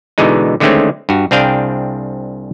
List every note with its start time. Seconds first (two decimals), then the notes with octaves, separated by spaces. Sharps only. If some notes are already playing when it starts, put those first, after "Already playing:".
0.18 B2 D3 E3 G#3 D#4
0.60 D3 D#3 G#3 A3 C4 C#4
1.09 G2 F#4
1.31 C2 C4 D4 G#4 F5 G5